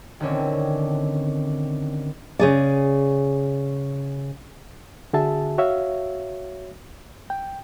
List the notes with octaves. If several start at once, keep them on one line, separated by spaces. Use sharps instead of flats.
D#1 D3 C4 C#4
C#3 G#4 D5
D3 F#4 G#4 E5 A5
F#4 C#5 E5 F5
G5